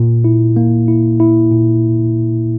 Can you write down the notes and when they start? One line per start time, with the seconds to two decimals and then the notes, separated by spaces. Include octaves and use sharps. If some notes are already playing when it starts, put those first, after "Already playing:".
Already playing: A#2
0.24 E4
0.57 A#3
0.88 E4
1.20 E4
1.51 A#2